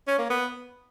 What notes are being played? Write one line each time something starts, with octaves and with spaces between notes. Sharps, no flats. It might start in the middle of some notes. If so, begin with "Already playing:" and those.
C#4
A#3
B3